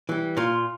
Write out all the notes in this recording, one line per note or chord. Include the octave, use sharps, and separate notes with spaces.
E3 G3
A#2 F4